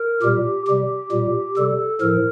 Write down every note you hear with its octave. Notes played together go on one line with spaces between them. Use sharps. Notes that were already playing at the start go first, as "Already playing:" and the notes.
Already playing: A#4
A#2 G3 G4
C3 G3 G4
A#2 G3
C3 G3 A4
A2 F3 A#4